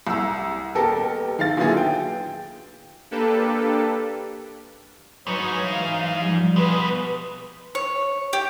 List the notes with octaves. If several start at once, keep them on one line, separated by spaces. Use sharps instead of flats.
C2 E6
D#1 B3 G4 A4 A#4
D#3 F5 A6
A#2 D3 F#3 B3 E4 G#4
G5
A#3 D4 G4 A4 B4
G#2 F#3 D#4 B4 C#5
E3 F5
F3 G3
B2 G#3 B4
C#5
G4